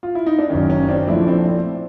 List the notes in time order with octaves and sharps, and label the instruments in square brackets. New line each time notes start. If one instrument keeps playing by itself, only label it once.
[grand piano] F4
E4
D#4
D4
F#1 F#2 D#3 C#4
C#4
C4 D4
A#1 A2 F3 A3 D4 E4
C4 D4